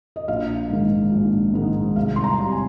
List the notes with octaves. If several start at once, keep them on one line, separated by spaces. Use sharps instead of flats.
D#5
A#1 F5
G#2 D#3 G#3 D#4
A#1
G#2 D#3 G#3 D#4
C2 F5
C6
A#5
C3 G3
G#5